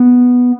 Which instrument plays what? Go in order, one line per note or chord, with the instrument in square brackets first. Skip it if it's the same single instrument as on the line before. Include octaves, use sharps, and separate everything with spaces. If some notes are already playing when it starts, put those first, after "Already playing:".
Already playing: [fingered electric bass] B3